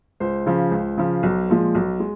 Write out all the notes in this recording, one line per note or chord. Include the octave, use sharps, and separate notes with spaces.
C#2 C5
C#3 F3
C#2
C#3 F3
B1
A#2 F3 G#3
B1
G#3